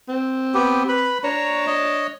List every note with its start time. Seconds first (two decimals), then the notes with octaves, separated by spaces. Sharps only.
0.09 C4
0.54 B3 G4
0.89 B4 B5
1.24 D4 C#5 A#5 C#6
1.67 C#5 D#5